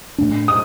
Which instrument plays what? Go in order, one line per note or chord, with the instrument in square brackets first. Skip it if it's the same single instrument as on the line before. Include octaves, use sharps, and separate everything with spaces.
[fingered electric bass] A2 A3 D4
[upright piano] D#6